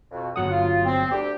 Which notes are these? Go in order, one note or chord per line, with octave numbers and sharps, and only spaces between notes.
F2 B2
G1 F#3 F#5 D#6
F4
C4
D2 G4